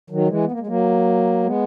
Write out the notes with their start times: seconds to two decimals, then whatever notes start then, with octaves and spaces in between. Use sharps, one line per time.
0.10 D#3 F#3
0.28 E3 G#3
0.44 B3
0.52 A#3
0.60 G#3
0.67 F#3 A#3
1.44 G#3 B3